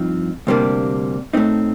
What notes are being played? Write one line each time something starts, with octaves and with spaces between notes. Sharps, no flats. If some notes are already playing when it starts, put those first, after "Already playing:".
Already playing: G2 F3 C4 D#4
D2 C3 G3 A#3 D4
A2 A3 C4 D#4